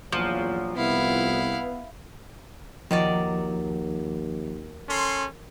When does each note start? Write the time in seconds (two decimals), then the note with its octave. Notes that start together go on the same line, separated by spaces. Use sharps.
0.12 A#1 E2 A#2 F3 F#3
0.76 C2 B3 E4 F5
2.91 D#2 D#3 F3 F#3 D5
4.90 C#4 A4 C6